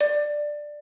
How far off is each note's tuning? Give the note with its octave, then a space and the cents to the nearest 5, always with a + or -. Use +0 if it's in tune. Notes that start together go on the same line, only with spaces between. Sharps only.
D5 +10